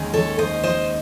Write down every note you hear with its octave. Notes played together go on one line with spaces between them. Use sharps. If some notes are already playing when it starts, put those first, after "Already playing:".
Already playing: D#2 D#3 G#3 C#4
A4 C#5
C5 D#5
C5 D#5